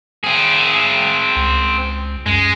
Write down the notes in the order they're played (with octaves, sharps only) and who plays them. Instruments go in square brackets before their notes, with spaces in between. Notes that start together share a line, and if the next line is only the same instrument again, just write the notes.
[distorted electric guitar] C4 G#4
[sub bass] C#2
[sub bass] F#2 [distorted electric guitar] G#3